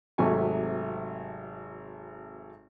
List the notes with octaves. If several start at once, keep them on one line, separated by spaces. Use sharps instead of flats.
G#1 C3 F#3 A3 G#5 C#6